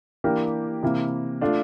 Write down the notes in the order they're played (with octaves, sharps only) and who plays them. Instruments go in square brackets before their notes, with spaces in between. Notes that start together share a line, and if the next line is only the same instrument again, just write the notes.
[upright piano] E3 A#3 D4 G4 A#4
C3 E3 A#3 E4
A3 D4 F4 A4